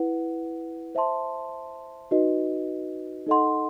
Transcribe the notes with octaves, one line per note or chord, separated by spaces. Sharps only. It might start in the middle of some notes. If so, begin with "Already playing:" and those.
Already playing: E4 B4 F#5
C5 E5 A5 C6
D#4 F#4 B4 D#5
D#4 A4 D#5 F#5 C6